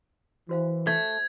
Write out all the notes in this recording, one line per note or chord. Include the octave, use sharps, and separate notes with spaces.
E3 F#4 C5 F5
A3 G#6